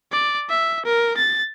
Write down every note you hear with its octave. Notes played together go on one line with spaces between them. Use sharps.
D5
E5
A#4
A6